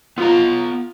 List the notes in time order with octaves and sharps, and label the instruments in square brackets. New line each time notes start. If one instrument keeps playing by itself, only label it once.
[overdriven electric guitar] B3 A#5 [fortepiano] F4